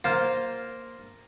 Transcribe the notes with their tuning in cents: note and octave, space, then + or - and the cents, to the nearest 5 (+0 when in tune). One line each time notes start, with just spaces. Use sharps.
A#3 +0 F4 +0 C5 +0